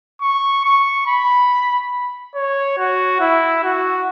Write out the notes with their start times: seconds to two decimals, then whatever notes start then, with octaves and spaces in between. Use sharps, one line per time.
0.22 C#6
0.65 C#6
1.07 B5
2.35 C#5
2.78 F#4
3.20 E4
3.63 F#4